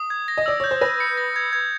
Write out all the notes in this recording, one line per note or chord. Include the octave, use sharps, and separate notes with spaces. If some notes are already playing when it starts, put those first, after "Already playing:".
Already playing: D#6
G#6
A#6
D#5
D5 E6
C#5 G6
C5
B4 A#6
C#7
A#6
G#6
G#6